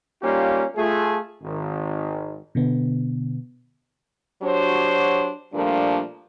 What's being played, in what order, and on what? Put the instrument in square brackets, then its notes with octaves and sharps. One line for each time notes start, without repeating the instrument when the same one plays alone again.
[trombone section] G3 A#3 C#4 D#4 F4 G4
A3 F4 G#4
G#1 D#3
[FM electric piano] B2 D3 B3
[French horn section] F#3 D4 F#4 G4 C5 C#5
A#2 F3 G3 A3 A#3 D4